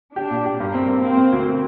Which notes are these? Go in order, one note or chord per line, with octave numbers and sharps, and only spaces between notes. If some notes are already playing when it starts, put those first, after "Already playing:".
D4 G4
A#2
G4
G2 A#3
C4
C4
A#3 C4
A#3
D2